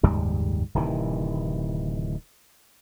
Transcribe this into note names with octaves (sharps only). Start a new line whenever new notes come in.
F#1 D#2 G#2 G3
D1 C3 D#3 E3